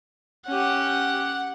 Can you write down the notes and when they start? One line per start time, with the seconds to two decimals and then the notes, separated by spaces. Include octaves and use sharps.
0.47 C#4 G4 F#5